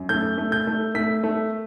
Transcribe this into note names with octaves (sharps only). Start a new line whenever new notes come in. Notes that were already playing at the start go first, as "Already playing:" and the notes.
Already playing: F#2
A3 G6
A3
G6
A3
A3 B6
A3